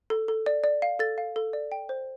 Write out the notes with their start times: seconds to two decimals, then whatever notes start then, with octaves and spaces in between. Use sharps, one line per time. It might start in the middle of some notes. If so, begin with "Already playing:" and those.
0.10 A4
0.28 A4
0.46 D5
0.64 D5
0.82 F5
0.99 A4 A6
1.18 F5
1.36 A4
1.53 D5
1.72 G5
1.89 C5